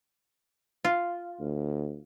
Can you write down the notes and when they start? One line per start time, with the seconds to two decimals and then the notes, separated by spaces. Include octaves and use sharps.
0.85 F4
1.41 D2